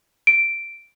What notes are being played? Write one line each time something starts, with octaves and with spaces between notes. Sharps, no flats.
D7